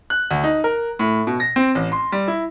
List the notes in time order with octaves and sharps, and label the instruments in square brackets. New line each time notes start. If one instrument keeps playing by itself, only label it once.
[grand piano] F#6
D2
D#4
A#4
A2
B2
A#6
C4
A1
C6
G3
E4